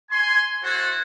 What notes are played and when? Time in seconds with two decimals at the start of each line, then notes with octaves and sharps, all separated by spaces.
0.11 G#5 C6
0.64 E4 F#4 A4 C5 F#5